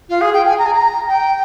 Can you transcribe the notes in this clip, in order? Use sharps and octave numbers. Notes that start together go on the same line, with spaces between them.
F4
G#4
G5
G#5
A#5
G#5
A#5
G5